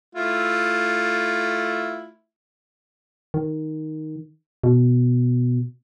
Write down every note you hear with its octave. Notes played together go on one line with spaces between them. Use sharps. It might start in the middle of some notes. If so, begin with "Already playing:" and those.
A3 E4 F4
D#3
B2